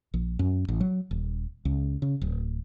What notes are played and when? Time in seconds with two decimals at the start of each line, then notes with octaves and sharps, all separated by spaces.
0.14 A#1
0.39 F#2
0.68 A1
0.81 F#3
1.11 D#1
1.65 C#2
2.02 C#3
2.21 D1